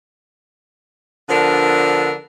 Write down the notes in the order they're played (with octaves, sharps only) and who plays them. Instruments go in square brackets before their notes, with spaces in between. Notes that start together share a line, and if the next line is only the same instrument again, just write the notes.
[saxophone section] D3 F3 B3 D4 A4 A#4